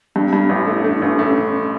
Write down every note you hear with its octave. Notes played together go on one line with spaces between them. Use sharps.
G2 D4
G2 D4
A1 E4
A3 E4
A3 D4
E4
A1 D4
A3 C#4